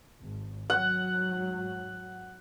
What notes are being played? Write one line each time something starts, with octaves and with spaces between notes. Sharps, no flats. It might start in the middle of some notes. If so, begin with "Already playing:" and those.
G#1
G#2 F#3 F#5